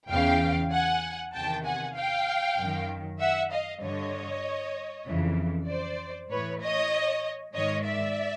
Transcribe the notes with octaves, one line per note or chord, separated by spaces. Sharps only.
E2 C#3 E3 F5 G5
F#5 G#5
E2 C3 D#3 G5 A5
F#5 G#5
F5 G5
F#2 D#3
E5 F#5
D#5 F5
G2 D3 C#5 D#5
F2 C#3 E3
C5 D5
A2 E3 B4 C#5
C#5 D#5
G#2 D#3 C#5 D#5
D5 E5